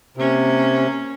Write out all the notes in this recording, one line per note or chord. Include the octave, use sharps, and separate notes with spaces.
C3 A#3 C#4